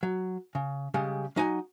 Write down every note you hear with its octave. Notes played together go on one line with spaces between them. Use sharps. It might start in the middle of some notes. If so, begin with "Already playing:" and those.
F#3
C#3
C#3 G3 G#3
F#3 D#4 F#5 G#5